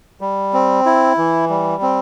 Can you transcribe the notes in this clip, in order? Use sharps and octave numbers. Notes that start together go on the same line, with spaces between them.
G3
C4
E4
E3
G3
C4